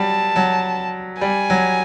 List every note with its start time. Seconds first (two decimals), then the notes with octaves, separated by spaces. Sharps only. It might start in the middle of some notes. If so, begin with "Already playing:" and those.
Already playing: F#3 G3 A5
0.36 F#3
1.21 G3 G#5
1.50 F#3